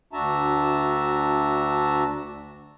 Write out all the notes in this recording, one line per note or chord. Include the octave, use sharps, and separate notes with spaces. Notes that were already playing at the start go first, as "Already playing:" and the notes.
D2 D4 F#4 E5 A5 A#5